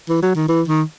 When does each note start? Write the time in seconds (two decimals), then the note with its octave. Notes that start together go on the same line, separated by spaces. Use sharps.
0.09 E3
0.22 F#3
0.35 D#3
0.48 E3
0.68 D#3